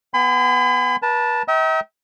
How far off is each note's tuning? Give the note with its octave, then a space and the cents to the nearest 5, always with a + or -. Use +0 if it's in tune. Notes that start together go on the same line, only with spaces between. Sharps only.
B3 +0 G#5 -35 B5 +40
B4 -40 A5 +0
E5 -45 G5 -25 A#5 +0